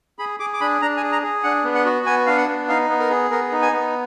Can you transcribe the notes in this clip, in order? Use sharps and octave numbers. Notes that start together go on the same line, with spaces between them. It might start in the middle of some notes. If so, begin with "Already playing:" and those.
G#4 B5
G#4 D6
D6
D4 B5
D4 A#5
G#5
G#4
A#5
G#4
D4 F#5
B3
F#5
F#4
B3 G#5
D4 F5
F#5
B3
D#4 F5
B3
A#4
G#4
B3 A#4
D#4
G#5
B3